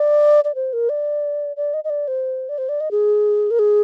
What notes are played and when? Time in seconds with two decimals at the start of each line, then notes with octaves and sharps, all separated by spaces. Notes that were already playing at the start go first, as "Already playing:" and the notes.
Already playing: D5
0.44 D5
0.55 C5
0.73 A#4
0.89 D5
1.57 D5
1.74 D#5
1.84 D#5
1.90 D5
2.08 C5
2.49 D5
2.58 C5
2.69 D5
2.80 D#5
2.91 G#4
3.51 A#4
3.59 G#4